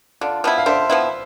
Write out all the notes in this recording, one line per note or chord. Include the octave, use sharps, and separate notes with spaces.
D3 D4 F4
F3 B3 E4
F5
D3 C5 E5
F3 B3 E4